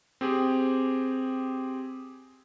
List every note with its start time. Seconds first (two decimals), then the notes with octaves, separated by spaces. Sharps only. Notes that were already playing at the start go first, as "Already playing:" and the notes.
0.21 C4 G4 G#4